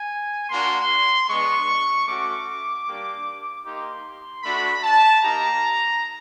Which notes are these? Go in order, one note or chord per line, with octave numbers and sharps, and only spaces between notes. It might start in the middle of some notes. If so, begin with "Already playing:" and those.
Already playing: G#5
A#3 D4 F#4 C6
G#3 B3 D4 C#6
A3 C#4 F#4 D6
G3 A#3 D4 G4
A#3 D#4 G4 C6
A3 D4 F#4 B5
A5
A#3 D#4 G4 A#5